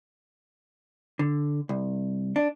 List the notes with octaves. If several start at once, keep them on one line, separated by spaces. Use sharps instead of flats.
D3
C2
D4